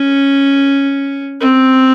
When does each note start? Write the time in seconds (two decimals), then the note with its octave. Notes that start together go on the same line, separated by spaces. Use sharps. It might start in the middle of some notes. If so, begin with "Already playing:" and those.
Already playing: C#4
1.41 C4